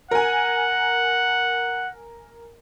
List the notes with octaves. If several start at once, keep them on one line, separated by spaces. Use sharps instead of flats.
A#4 F#5 G#5